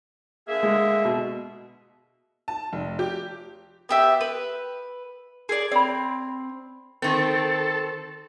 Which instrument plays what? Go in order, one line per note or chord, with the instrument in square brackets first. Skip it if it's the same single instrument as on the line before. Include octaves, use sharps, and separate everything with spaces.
[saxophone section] D3 A#3 G#4 [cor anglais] E5
[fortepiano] G#3
B2
[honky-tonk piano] A5
F1
G4
[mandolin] B3 G4 E5
B4
G#4 A4 D5
[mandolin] C4 [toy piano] D5 B5
[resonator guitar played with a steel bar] D#3 C4 [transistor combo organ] A4